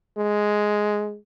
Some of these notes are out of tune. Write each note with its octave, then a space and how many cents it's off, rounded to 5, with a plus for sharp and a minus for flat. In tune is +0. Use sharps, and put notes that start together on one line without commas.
G#3 +5